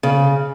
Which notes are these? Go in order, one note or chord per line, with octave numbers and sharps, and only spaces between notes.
C#3